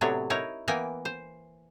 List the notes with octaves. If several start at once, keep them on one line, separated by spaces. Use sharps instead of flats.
A2 C3 F#3 B3 D4 C#5
D#4 E4 A#4 C#5
E3 A#3 B3 A#4 G5 G#5
C5